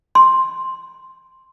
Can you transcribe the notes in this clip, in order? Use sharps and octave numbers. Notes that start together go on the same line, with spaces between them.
C6